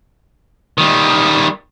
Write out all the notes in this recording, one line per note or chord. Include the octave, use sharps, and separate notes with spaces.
D#3 G3